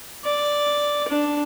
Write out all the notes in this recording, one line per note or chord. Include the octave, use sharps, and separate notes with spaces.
D5
D4